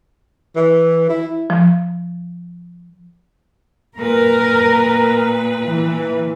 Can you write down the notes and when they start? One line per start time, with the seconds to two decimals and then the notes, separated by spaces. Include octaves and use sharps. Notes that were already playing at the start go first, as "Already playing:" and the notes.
0.56 E3
1.09 E4
1.50 F3
3.98 A#2 A#4 B4
5.67 E3